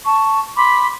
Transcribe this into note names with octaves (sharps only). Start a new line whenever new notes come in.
A5 C#6
B5 C6 D6